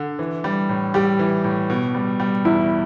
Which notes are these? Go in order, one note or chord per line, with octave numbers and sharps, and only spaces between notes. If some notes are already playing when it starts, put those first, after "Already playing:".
Already playing: D3
E3
G3
A2
G3 G4
E3
A2
B2
G3
G3
E2 E4